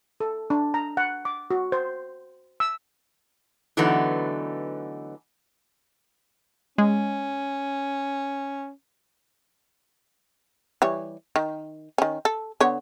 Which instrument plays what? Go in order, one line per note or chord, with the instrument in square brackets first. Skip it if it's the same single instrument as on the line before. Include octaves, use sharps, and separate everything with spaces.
[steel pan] A4
D4
A#5
F#5
D6
F#4
C5
E6
[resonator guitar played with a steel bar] D3 E3 F#3 A3 B3 D#4
[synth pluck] G#3 [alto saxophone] C#4
[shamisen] E3 G3 C#5
D#3
D#3 C#4
A4
D3 B3 C#5